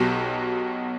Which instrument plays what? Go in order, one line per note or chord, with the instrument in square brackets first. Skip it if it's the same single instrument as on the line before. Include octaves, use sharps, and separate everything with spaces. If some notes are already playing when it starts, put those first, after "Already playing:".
Already playing: [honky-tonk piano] B1 B2 F#3 G4